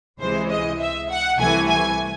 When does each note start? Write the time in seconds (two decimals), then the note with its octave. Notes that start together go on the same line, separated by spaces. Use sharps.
0.20 C#2 C3 E3 G#3 C5
0.49 D#5
0.79 E5
1.10 F#5
1.39 C2 C3 E3 A3 G#5
1.68 G#5